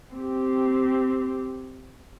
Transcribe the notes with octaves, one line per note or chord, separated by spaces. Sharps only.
C4 G4